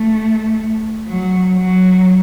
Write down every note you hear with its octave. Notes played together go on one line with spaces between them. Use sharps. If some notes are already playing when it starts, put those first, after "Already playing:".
Already playing: A3
F#3
F#3